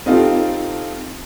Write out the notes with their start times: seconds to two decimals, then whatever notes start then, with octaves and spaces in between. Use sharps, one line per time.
0.06 C4 D#4 F4 G4 A4